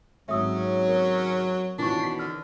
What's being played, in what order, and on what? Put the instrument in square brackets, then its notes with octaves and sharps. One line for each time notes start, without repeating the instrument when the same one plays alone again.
[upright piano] G#1 G#2 [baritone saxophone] F#3 [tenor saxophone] C#4 [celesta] E5 D#6 E6
[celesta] A#4
[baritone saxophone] B2 [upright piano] D#3 E3 C#4 [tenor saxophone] D4 [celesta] F4 C#6
[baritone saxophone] B2 [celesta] B6 C7
[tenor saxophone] D3 [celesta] F6